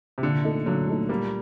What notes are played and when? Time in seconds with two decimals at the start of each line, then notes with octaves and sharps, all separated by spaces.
0.18 C3
0.22 A#2 D3
0.44 A3 D#4 A4
0.66 A#2 D3 F#3
0.87 A3 D#4 A4
1.09 A#2 G3 A#3